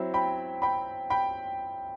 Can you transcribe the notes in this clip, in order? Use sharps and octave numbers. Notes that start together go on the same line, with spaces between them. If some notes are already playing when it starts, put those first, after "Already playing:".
Already playing: F#3 C4 E4
G5 B5
G5 B5
G5 B5